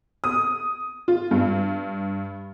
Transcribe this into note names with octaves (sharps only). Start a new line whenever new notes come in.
D#6
F4
G2